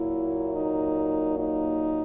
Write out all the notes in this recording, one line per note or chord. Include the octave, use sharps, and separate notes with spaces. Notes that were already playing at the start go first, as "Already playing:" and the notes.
Already playing: A#2 F#3 A#3 E4
D#4
D#4